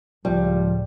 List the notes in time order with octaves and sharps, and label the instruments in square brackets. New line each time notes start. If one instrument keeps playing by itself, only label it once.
[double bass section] C#2 A2 [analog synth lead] F3 [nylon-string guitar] G3